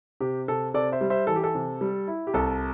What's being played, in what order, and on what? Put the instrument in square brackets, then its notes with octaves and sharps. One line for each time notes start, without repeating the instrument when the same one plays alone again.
[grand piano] C3 G4
C3 A4
C3 A4 D5
C5 E5
G3
C5 E5
E3 A4
G4
A4
C3
G3
E4
G4
C2 A4